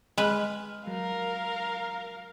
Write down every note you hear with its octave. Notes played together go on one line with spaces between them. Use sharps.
G#3 B4 D#5 F6
F#3 A#4 F5